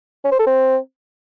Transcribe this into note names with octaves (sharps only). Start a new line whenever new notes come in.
C#4
C5
A4
C4